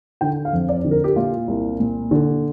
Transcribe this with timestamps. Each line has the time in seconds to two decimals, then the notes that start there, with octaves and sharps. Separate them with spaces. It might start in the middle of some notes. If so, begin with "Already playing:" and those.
0.21 D3 G5
0.45 F5
0.53 F2
0.69 D5
0.85 D3
0.91 A#4
1.04 G4
1.16 A#2 F4
1.48 C2
1.80 A#2
2.11 D3